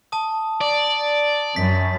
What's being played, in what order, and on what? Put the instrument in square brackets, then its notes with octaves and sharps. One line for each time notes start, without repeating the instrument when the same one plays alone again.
[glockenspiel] A5 D#6
[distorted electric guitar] D5
[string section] F#2 [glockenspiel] B6